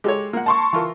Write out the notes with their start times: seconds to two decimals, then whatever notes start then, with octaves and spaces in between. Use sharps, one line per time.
0.04 G#3 G4 A4 C#5
0.33 A#3 F#5
0.46 A5 C6 C#6
0.73 E3 F4 A#4